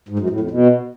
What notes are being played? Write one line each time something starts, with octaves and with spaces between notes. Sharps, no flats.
G#2
F#2
A2
F2
B2